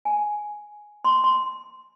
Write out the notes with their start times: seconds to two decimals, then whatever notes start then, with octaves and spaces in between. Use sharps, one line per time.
0.05 G#5
1.05 C6
1.24 C6